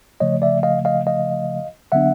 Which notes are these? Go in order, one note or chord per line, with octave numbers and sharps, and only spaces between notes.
C#3 F3 A3 C#5 D#5
D5 E5
D#5 F5
D#5 F5
D#5 F5
D3 F#3 B3 D4 E5 F#5